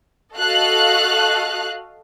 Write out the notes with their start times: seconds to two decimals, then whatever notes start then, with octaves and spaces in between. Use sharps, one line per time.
0.37 F#4 A4 D#5 F5 F#6